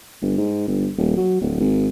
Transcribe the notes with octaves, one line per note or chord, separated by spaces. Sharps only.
G1
G#2
G1
D#1
F#3
D1
G#1